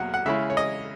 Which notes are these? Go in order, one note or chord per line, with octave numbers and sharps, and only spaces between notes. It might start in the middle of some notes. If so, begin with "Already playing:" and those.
Already playing: E2 B2 F#3 A#3 F#5
F#5
C#3 G#3 C#4 E4 E5
C#5
D#5